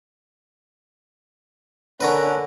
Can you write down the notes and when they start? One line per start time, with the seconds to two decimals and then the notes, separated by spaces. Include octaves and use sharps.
2.01 D3 C#4 A#4 B4